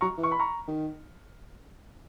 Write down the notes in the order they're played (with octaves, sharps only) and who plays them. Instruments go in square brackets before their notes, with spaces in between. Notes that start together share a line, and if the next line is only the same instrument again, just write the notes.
[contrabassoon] F#3 [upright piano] A#5 C#6
[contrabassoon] E3
[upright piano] C#6
B5
A#5 C#6
[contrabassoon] D#3